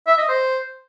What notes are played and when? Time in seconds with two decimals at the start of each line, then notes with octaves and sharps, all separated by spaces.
0.07 E5
0.18 D#5
0.28 C5